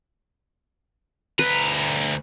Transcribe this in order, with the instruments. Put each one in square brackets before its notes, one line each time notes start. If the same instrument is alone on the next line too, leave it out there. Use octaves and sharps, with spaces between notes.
[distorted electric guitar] D2 A#5 [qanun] B4